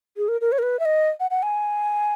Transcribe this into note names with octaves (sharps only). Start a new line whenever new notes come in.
G#4
A#4
A#4
C#5
A#4
B4
E5
D#5
F#5
F#5
G#5